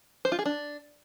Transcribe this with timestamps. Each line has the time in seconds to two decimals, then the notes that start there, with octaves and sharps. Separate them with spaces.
0.25 C5
0.32 F4
0.39 G#4
0.46 D4